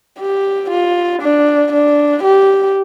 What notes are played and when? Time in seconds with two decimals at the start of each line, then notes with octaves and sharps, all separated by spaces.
0.20 G4
0.70 F4
1.22 D4
1.72 D4
2.23 G4